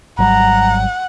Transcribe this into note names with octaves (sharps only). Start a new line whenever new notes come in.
G#1 F#3 G3 F#5 A#5